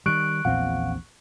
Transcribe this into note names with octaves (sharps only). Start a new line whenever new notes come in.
D#3 G3 C#6 F#6 D7
A#1 E2 A#2 C4 F5 F#5